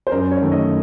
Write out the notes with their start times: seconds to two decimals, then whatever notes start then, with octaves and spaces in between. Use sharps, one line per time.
0.07 C5
0.11 F#2 A#4
0.31 C#5
0.42 D#3 A3
0.52 D#5